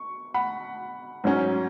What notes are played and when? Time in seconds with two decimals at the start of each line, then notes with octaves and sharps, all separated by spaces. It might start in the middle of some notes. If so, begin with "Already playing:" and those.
Already playing: C#6
0.34 F#5 B5
1.24 G#2 F#3 C#4